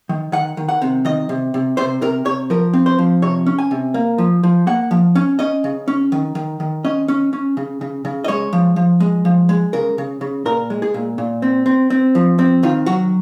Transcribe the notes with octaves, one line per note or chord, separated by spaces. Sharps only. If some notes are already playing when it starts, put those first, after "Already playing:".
D#3
D#3 F#5
D#3
F#5
C3
D#3 D#5
C3
C3
C3 C5
C3 A#4
C3 C#5
F3 A#4
C4
C5
F3
C3 C#5
C#4
G#5
C3
A#3
F3
F3
A#3 F#5
F3
C#4
C#4 D#5
C#3
C#4
D#3
D#3
D#3
C#4 D#5
C#4
C#4
C#3
C#3
C#3
D#5
G#3 C#5
F3
F3
G#3
F3
G#3
C#3 A#4
C#3
C#3
A#2 A#4
G#3
G#4
A#2
A#2
C4
C4
C4
F3
C4
D#3 F4
F#3 F#4